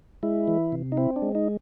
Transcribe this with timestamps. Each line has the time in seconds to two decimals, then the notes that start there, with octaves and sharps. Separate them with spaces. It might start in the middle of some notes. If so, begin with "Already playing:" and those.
0.23 G#3 E4
0.48 E3
0.72 C3
0.92 D#4
0.97 C4 E4
1.16 D4
1.22 G#3
1.35 D#4